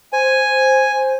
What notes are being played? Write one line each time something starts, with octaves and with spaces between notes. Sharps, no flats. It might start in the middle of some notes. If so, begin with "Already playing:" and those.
C5 G#5